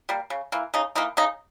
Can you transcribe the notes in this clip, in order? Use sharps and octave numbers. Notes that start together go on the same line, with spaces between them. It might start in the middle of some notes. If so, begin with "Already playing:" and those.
G3 A#3
C#3
E3 A#3
C#3 D#4
E3 A#3 D#4
C#3 D#4